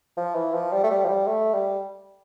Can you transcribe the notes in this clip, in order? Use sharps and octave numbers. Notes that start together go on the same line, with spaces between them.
F3
E3
F3
G3
A3
G3
F3
G3
A3
G3